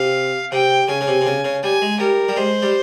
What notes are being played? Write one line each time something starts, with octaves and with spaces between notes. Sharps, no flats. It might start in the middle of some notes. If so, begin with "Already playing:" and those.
Already playing: C3 F5
C3 G5
C#3 G#5
C#3
C3
C3
C#3
C#3
G3 G#5
G#3
G3 A#4
G3
G#3 C5
G3